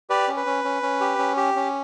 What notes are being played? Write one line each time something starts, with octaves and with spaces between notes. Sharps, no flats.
G4 B4 D5
C#4
B4
C#4
C#4
C#4
G4
C#4
G4
C#4